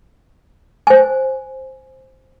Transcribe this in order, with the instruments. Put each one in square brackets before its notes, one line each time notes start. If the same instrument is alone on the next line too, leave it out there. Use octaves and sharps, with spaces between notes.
[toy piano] C5 G#5